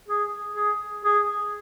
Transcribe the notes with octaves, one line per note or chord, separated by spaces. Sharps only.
G#4
G#4
G#4